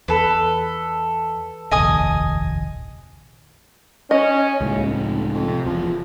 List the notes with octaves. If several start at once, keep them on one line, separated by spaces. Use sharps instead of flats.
E2 A4 B4
F1 A#1 D#2 D#5 G#5 D#6
C#4 D#5
D#1 C#2 A2 C#3
F1
F2
C3
E1 E2 F3